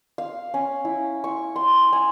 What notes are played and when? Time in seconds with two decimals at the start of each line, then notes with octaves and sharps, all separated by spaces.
0.18 F5
0.54 C#4
0.85 E4
1.24 C#6
1.56 C6
1.93 G#5